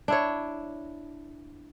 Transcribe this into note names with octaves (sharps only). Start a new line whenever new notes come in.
D4 E4 C#5